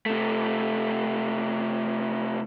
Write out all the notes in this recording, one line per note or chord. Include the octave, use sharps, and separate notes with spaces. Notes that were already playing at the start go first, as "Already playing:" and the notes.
C3 A3